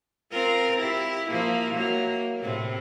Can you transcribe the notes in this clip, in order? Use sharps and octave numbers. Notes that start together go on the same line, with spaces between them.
C4 F4 A#4
E4 G4
F3 A#3 E4
F#3 A#3
A2 C3 C4